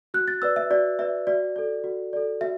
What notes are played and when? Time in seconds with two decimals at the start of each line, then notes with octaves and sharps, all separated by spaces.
0.14 F#4 F#6
0.28 A6
0.42 B4 D5 E6
0.56 E5
0.70 F#4 D5
0.99 B4 D5 E5
1.27 F#4 D5
1.56 A4 D5
1.84 F#4
2.13 A4 D5
2.41 F#4 E5